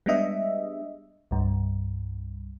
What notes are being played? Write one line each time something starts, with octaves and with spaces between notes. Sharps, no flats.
G3 G#3 B3 D4 D#5 E5
C2 G2